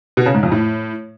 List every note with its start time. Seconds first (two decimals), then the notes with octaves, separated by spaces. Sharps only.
0.17 B2
0.26 C#3
0.34 G#2
0.43 F2
0.52 A2